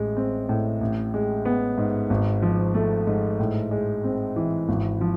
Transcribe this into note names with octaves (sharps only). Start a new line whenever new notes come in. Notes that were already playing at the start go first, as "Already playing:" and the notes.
Already playing: A1 G#3
C4
A2
A1
G#3
B3
G#2
G#1
F3
A3
G#2
A2
G#3
C4
E3
G#1
F3